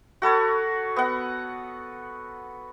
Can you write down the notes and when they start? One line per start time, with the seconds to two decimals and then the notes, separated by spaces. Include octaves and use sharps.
0.22 F#4 A4 B4 C#5
0.96 B3 F#5